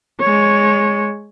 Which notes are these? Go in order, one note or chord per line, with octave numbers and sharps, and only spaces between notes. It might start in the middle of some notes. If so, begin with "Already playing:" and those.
G#3 C#5